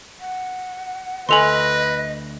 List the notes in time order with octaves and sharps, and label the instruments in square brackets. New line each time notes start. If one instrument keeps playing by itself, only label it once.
[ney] F#5
[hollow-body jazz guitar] D2 A4 G#5 [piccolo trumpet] B4 [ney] D#5 [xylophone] C6 F7 F#7